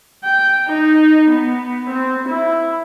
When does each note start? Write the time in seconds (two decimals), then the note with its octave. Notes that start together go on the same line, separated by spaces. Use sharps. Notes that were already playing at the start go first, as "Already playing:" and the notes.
0.24 G5
0.69 D#4
1.31 B3
1.90 C4
2.28 E4